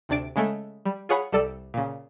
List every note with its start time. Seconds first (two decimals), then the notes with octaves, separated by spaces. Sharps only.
0.09 D2 C3 D4 A6 D7
0.36 C#3 G#3 A3
0.85 G3
1.09 F4 G#4 C#5 F#5 B5
1.32 C2 G3 A4 D5 E6
1.74 A#2 C#3